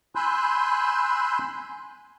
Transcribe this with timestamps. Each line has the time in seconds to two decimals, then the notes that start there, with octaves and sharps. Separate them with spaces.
0.15 G#5 B5 C6 E6 F#6 G6